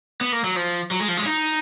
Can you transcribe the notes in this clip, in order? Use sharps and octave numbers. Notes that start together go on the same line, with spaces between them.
B3
A#3
F#3
F3
F#3
G#3
F3
G#3
C#4
D#4